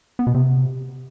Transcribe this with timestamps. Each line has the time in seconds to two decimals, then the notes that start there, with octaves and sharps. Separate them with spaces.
0.19 B3
0.27 B2
0.34 C3